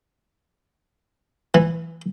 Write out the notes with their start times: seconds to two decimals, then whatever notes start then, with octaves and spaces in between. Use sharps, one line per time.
1.54 E3